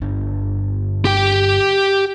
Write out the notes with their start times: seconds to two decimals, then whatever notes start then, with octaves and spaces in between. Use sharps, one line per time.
0.01 G1 D4
1.05 G4 G5